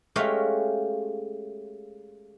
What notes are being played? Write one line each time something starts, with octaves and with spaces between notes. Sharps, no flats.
G#3 A3 C#4 G4 F5 F#5